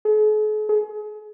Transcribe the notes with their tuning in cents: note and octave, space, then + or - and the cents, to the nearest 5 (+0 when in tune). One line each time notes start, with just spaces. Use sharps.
G#4 +45
G#4 +35